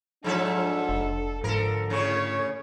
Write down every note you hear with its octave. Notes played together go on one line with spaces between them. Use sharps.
G#2 F3 D4 A4 E5
F1
G#2 D3 F3 A4 A#4
A2 C#3 C#4 C#5